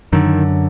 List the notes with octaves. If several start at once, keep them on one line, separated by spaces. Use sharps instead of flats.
F#2 D3 D#3